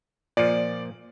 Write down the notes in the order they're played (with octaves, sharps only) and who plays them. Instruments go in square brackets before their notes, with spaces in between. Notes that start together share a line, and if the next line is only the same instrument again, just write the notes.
[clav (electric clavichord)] A#2 F3 [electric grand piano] D5